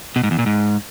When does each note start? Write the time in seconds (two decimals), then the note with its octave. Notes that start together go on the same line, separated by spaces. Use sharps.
0.16 B2
0.23 G#2
0.31 E2
0.39 A#2
0.46 G#2